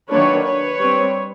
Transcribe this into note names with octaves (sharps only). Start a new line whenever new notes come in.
D#3 F#3 A#3 D4 B4 C#5
B4 C#5
G3 C4